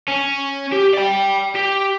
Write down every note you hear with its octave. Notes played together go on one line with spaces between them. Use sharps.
C#4
G4
D5 G5
G4